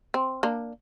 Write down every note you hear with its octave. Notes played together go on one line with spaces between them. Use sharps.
C4
A#3 D4